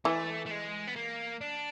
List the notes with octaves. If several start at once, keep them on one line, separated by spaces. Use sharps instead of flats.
E3 A3
A3
G#3
B3
A#3
D4